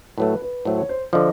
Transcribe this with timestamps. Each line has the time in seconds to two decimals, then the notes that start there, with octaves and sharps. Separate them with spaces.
0.18 A2 F#3 A3 B4
0.42 B4
0.65 A2 F#3 A3 C5
0.78 C#5
0.89 C5
1.13 D3 F3 D#5